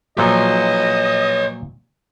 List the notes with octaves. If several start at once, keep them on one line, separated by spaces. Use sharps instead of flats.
A#2 F3 F#3 B4 C#5 D#5